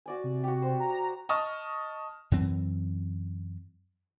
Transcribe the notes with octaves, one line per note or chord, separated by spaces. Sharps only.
F#4 D5 G#5
C3
F#4 G4
C5
A#5
D#5 A5 C#6 D#6 F6
F#2 E3 C4